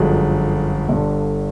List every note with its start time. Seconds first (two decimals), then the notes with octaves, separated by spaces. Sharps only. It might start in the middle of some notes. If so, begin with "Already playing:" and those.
Already playing: G1 F#2 D3 F3 G#3
0.88 G1 G2 D3